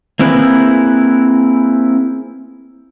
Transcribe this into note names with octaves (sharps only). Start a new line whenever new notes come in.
A#3 C4 E4 G#4 B4